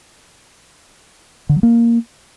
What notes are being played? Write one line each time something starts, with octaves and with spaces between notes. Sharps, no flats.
D3
F#3
A#3